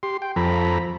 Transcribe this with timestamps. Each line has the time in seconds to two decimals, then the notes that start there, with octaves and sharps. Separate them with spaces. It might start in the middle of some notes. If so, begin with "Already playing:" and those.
0.03 G4 C6
0.22 G5
0.36 F2 F3 A4 A#5 B5